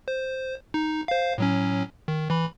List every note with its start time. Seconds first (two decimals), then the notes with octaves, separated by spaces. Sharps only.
0.08 C5
0.74 D#4
1.08 C5 F5
1.38 A2 F#3 C#4
2.08 D#3
2.30 E3 B5